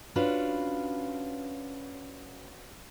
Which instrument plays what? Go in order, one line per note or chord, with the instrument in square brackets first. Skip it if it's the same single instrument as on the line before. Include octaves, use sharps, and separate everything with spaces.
[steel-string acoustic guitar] C#4 D4 F4 F#4 B4